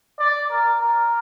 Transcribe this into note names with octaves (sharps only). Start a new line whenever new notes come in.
D5
A#4
A#4